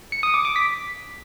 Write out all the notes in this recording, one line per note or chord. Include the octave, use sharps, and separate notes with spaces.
C#7
D#6
D6
D6
B6